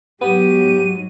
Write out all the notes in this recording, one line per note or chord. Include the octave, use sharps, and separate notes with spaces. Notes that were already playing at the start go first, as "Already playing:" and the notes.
G#2 F#3 B3 G4 D#7